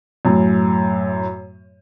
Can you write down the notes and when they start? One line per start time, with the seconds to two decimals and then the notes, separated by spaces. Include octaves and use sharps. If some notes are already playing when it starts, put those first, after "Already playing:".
0.25 F#2 A2